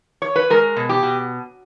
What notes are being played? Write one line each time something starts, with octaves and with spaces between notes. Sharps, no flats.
C#5
B4
G#3 A#4
B2
G4
B2